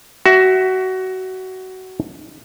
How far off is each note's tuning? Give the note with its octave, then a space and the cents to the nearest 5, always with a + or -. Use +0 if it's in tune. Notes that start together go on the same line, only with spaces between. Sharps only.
F#4 +20 E5 +0